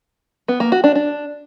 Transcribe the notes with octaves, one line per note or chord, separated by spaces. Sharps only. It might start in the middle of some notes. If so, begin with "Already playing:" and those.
B3
A#3
F#4
D4
D4